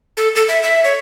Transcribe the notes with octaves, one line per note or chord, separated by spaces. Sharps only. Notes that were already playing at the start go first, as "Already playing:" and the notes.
A4
A4
E5
E5
C#5